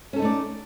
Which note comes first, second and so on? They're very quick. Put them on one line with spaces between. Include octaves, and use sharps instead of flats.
C#4 A4 D#4 A3 D5